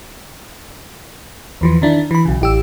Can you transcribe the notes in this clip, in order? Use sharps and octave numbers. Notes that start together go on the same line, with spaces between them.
E2 E3 F3
D#3 D4 E4
E3 B5
B1 C#3
A1 G4 E6